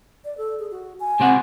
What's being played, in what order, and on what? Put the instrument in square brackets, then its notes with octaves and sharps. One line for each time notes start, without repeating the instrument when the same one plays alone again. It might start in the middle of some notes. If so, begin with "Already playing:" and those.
[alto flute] D5
A4
G#4
F#4
G#5
[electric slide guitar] C3 C4 F#5